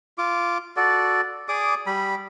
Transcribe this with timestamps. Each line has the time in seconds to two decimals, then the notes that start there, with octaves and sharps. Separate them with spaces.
0.18 F4 D6
0.77 F#4 A4 D5
1.48 G#4 D5 D6 D#6
1.87 G3 B5